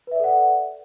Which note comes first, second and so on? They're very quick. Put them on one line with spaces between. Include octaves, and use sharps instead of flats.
B4 E5 D5 A4 F#5